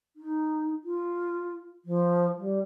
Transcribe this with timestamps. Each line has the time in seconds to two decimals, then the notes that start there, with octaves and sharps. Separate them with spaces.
0.16 D#4
0.84 F4
1.85 F3
2.37 G3